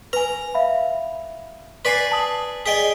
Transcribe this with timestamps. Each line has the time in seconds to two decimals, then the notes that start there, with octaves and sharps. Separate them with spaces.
0.13 B4 G#5 A#5
0.54 E5 F5 B5
1.85 B4 D5 G#5 B6 C7
2.11 A5 D#6 F#7
2.66 G#4 D5 D#5 G5 G#5 B6